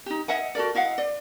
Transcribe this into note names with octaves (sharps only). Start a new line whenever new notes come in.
D#4 G4
D#5 E5 F#5 G#5
F#4 A4 A#4 D5
E4 D#5 F5 F#5
D5